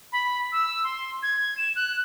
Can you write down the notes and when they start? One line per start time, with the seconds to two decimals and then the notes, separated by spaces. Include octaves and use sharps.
0.12 B5
0.52 E6
0.84 C6
1.23 G#6
1.57 E7
1.76 F#6